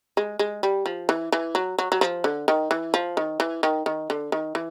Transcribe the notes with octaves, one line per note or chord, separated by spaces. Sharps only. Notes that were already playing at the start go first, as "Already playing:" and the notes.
G#3
G#3
G3
F3
E3
E3
F#3
F#3
F#3
F3
D3
D#3
E3
F3
D#3
E3
D#3
D#3
D3
D#3
E3